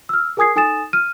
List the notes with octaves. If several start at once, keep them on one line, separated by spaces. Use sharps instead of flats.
E6 F6
G#4 A#4 G#5 D#6 G#6 C7
D#4 A4 G#5 D#6 A6 E7
F6 D#7